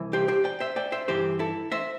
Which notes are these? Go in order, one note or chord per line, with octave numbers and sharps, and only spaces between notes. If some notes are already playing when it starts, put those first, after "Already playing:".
Already playing: C2 C3 E3
G4 C5
G4 C5
D5 G5
C5 E5
D5 G5
C5 E5
G2 E3 G4 C5
E4 A4
C5 E5